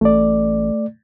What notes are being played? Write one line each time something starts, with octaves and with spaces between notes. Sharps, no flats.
A1 A3 D5